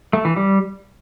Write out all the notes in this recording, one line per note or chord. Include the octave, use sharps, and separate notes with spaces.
A3
E3
G3